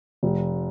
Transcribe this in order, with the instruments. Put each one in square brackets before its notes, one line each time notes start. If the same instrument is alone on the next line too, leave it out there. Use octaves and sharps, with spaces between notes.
[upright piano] F1